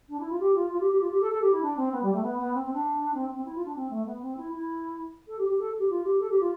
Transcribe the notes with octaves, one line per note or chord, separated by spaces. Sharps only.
D4
E4
F4
G4
F4
F4
G4
G4
F4
G4
A4
A4
G4
E4
D4
C4
B3
G3
A3
B3
B3
C4
C4
D4
C4
C4
E4
F4
D4
C4
A3
B3
C4
E4
E4
A4
G4
G4
A4
G4
F4
G4
A4
G4
F4